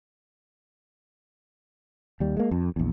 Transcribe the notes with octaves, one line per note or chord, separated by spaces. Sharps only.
D#2 G3
G#3 A#3
F2
A#1 E2